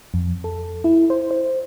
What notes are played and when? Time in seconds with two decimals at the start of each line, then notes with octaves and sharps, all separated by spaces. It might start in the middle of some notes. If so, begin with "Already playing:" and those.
0.14 F2
0.44 A4
0.84 E4
1.10 C5
1.31 C5